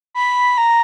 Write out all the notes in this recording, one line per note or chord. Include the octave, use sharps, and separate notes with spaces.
B5
A#5